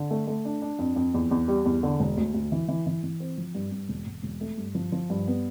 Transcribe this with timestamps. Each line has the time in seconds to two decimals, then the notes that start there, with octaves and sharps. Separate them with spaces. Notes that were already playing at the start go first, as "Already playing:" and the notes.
Already playing: D3
0.11 A3
0.27 A3
0.45 D4
0.62 D4
0.79 F2
0.96 F2
1.14 E2
1.31 E2
1.48 G3
1.65 E2
1.83 D3
2.00 E1
2.17 D2
2.34 D2
2.52 E3
2.69 E3
2.87 E3
3.04 E3
3.20 C4
3.38 F3
3.55 G2
3.72 G2
3.89 E1
4.06 E1
4.23 E1
4.41 A3
4.58 G2
4.75 F3
4.92 F3
5.10 G2
5.28 B3